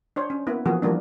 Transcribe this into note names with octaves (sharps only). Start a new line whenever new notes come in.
D4 C5 C#5
C#4
A#3 B3 E4
E3 F3 A#3 B3 F#4 G#4
E3 F3 G3 A#3 D4